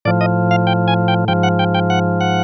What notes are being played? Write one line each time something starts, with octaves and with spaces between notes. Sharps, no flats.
A2 F3 D5
D#5
F5
G5
G#5
G5
G#2 F3 G5
F#5
G5
G5
F#5
F#5